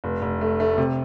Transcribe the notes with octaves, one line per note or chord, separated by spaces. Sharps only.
F1
F1
A3
A3
C3